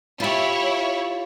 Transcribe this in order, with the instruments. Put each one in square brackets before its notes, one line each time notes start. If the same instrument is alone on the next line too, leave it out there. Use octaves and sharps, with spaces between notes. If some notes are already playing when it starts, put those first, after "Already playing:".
[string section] E4 C#5 [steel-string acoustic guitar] F4 G4